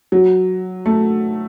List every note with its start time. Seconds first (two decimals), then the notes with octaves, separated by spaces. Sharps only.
0.12 F#3
0.86 A3